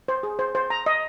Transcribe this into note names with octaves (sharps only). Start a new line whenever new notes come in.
C5
G#4
C5
C5
A#5
D#5